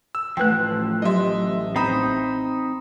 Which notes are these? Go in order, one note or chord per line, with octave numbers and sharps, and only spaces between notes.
E6
A1 F3 A3 B4 G5 F#6
F#3 G4 D#5 E5 C6
C4 D#4 C5 A#5 B5 D#6